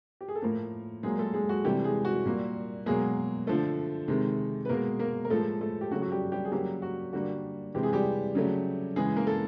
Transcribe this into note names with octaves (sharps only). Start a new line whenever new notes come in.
G4
G#4
A4
A2 F3 A#3 A#4
A#2 F#3 G#3 A#3 G#4
A3 A4
G#3 G#4
F#4
C3 E3 G3 A3 G4
G#3 G#4
F#4
A#2 G3 A#3
B2 F#3 G#3 A#3 G#4
D3 F3 A3 A4
C3 D#3 G#3
B4
B2 G#3 A#3 A#4
A#3 A#4
A#4
A2 F3 G#3 A3 A4
A3 A4
G4
C#3 F#3 A3 F#4
F#4
G3 G4
G3 G4
G#4
C#3 F#3 G3 A#3 G4
F#4
D3 G3 A#3 F#4
C3 E3 G#3 G4
G#4
G3 G4
C#3 F#3 A3
C#3 E3 G#3 G#4
A#3 A#4
A4